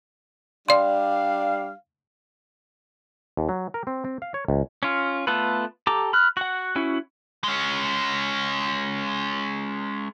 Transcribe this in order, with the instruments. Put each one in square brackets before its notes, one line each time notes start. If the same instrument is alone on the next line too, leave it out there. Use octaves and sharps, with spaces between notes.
[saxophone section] G3 D4 F5 [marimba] D5 C6
[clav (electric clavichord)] D#2
F#3
A#4
C4
C4
F5
C#5
C#2
[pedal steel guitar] C#4 F4
A3 B3 F4 A4 B4
G4 A4 A#5 D6
B5 F6 F#6
F#4 F#5
C#4 E4 F#4
[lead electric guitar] G#3 C#4